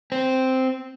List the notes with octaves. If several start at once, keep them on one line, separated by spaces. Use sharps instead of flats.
C4